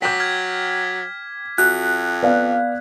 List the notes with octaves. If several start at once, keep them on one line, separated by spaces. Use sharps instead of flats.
F#3 G5 D6 G6 B6
F6 G#6
F2 F#4 F#6
B3 D5 F5